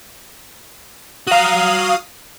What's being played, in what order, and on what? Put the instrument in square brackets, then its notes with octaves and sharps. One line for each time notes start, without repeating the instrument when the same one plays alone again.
[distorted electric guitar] F#4 A#5 [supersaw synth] F5 D#6